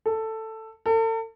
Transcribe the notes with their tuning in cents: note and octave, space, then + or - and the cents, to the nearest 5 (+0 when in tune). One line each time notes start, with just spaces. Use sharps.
A4 +10
A4 +40